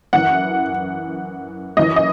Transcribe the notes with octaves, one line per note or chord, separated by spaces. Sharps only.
F#2 E3 F#5
F#2 E3 D#5
D#5